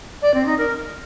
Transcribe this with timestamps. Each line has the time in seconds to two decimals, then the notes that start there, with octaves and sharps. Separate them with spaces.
0.22 D5
0.34 C4
0.46 D#4
0.58 A#4